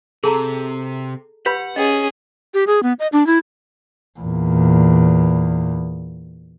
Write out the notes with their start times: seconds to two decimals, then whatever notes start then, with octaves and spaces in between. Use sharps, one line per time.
0.24 C3 G#4 A4 A5 A#5
1.46 G4 B4 F#5 B5 G6 B6
1.76 C#4 G#4 D#5
2.54 G4
2.67 G#4
2.83 B3
2.99 D#5
3.13 D4
3.27 E4
4.20 E2 A#2